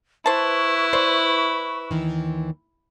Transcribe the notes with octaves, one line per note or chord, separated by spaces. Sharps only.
E4 B4 C5 A5 C#6
C5 D5 E5
D#2 D#3 E3